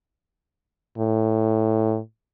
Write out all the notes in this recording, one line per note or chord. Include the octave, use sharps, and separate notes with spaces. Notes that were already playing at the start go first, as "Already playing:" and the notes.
A2